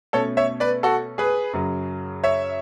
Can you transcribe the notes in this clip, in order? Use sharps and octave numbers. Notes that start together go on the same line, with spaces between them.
B2 A3 C#4 A4 C#5
C#5 E5
B4 D5
F#4 A4
G#4 B4
F#2 C#3 F#3
C#5 E5